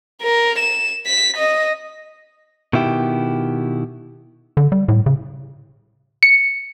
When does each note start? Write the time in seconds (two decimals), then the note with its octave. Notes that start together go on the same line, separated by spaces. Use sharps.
0.22 A#4
0.59 E7
1.07 B6
1.37 D#5
2.73 B2 D#3 E4 G4
4.57 D3
4.72 G3
4.88 A2
5.06 C#3
6.23 C#7